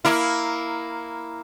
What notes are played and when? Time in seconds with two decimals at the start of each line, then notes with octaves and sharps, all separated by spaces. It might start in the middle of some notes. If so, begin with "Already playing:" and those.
0.05 A#3 E4